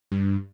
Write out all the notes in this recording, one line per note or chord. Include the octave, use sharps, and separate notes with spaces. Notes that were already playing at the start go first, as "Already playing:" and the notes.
G2